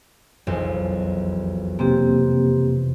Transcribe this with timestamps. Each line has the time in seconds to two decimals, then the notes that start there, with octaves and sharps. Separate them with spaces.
0.47 E1 B1 F2
1.79 C3 A#3 C4 G4